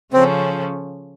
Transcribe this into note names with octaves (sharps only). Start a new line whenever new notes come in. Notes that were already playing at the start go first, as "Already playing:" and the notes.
C#3 F3 A3 C4 C#4